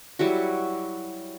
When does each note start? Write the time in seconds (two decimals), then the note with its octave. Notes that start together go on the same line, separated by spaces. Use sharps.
0.19 F#3 G3 E4 F#4